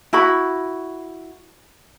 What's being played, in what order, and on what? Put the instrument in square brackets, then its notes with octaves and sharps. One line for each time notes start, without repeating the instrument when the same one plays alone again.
[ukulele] E4 F#4 B5